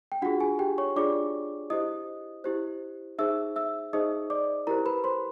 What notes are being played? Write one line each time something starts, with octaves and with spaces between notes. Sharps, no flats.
G5
D4 F4 F#4 G#4 F#5
G#4 G#5
G4 G5
C#5 C#6
D4 F4 G#4 D5 D6
E4 G4 C5 D#5 D#6
E4 G4 C5
D#4 G#4 C5 E5 E6
E5 E6
D#4 G#4 C5 D#5 D#6
D5 D6
E4 G4 A#4 C5 A#5
B4 B5
C5 C6